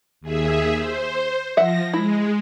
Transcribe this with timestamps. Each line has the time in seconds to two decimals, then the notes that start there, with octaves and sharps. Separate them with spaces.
0.21 D#2 G#4 E5
0.76 C5
1.57 F3 E5 F#5 A#6
1.94 G#3 E4